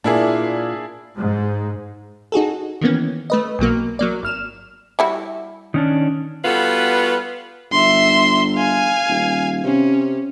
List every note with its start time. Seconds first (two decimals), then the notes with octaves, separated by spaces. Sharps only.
0.04 A#2 D4 E4 G#4
1.17 G#2
2.32 D#4 F#4 G#4 A4
2.81 D#3 E3 A#3 B3 C#4
3.30 A3 B4 D#5
3.59 B1 B2 F#3 A#3
3.99 F#3 A#3 D5
4.23 G#1 F6 E7
4.99 G3 E4 F#4
5.74 D#3 C#4 D4
6.44 G3 B3 F4 F#4 A4 B4
7.72 G1 E5 C6
8.55 F5 G#5
9.09 D#1
9.64 C3 C#4